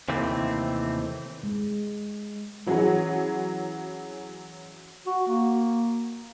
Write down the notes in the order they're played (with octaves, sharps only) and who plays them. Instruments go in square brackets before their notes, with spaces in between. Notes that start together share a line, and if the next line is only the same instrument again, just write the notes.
[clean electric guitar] D#2 C3 E3 A3 C4
[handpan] G#3
[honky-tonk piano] E3 F#3 C#4 F#4 G#4
[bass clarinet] F#4
A#3